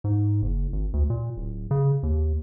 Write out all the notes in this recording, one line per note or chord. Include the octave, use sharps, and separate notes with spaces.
G#2
F#1
G#1
D2
A#2
D1
C#3
D#2